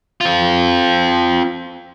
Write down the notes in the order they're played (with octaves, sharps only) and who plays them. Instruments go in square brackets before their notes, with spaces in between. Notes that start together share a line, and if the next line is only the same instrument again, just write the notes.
[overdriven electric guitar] C4 F4